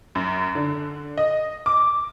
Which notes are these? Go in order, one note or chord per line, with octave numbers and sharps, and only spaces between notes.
F#2
D3
D#5
D6